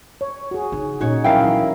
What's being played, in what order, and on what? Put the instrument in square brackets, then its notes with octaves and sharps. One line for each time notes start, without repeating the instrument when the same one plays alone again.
[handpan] C#5
F#4 G#4
[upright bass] C#3 D#4
[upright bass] A#2 [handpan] C#4 D#4 [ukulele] F#4 C#5
[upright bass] D2 F3 [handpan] F#3 A#4 [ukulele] C#4 F5 G5 [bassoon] E4
[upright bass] E3